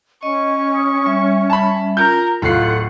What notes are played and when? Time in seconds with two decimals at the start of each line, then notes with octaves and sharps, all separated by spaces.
0.23 C#4 D#5 C#6
0.74 D#6
1.06 G3 E5
1.50 A5 B5
1.97 F4 A#4 G6
2.42 D1 F4 A4 F#5 C7